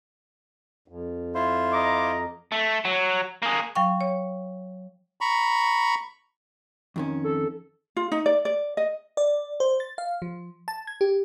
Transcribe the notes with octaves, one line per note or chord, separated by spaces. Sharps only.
F2
E4 F4 C5
D#5 A#5 D6
A3
F#3
A#3 G#4
F#3 F5 G5 C#6
C#5
A#5 B5 C#6
F2 D#3 C#4
A4
F4
D#4
D5
D5
D#5
D5
C5
A6
F5
F3
A5
G#6
G4